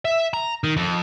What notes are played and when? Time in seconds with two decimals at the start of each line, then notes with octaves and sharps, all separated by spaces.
0.05 E5
0.34 A#5
0.64 D#3
0.77 F2